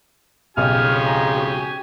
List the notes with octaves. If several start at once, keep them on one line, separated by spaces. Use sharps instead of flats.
B1 F2 G#2 C#3 G4 G#5 F6
A#5
F#4